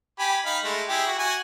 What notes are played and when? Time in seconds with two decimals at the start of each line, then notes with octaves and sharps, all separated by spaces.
0.19 G4 G#5 B5
0.46 D#4 F5 B5
0.64 G#3 A3
0.89 E4 G4 G#4
1.07 F#4
1.19 F#4 G#5